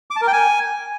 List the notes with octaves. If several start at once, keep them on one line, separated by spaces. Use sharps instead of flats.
D6
A5
A#4
G5
G#5